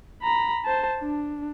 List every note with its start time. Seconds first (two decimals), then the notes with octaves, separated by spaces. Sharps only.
0.22 A#5 B5
0.65 C5 A5
1.00 D4